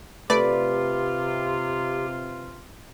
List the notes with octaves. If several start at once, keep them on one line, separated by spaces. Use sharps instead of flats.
C3 A3 F4 G4 B4 D5